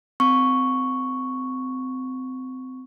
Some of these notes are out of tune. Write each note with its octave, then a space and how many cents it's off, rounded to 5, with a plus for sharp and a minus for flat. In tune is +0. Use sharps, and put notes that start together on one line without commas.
C4 -25 C#6 +0